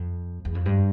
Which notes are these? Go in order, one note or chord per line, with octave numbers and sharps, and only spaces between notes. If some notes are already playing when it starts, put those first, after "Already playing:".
Already playing: F2
E2
F2
G2